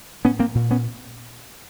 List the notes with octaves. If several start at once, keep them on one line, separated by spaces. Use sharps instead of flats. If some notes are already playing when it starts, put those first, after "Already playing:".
A2 B3 C#4
A#3 C4
A#2
B3 C#4